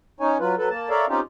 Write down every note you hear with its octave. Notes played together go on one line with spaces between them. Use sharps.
C#4 D#4 C#5 G#5
F#3 F4 B4
F#3 A4 B4
A#3 A5
A4 A#4 C#5 D5 E5 F5
C4 C#4 D#4 F4 G4